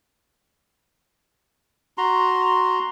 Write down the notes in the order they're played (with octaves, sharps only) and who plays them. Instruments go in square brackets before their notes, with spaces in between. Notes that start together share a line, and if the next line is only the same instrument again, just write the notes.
[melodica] F#4 A#5 C6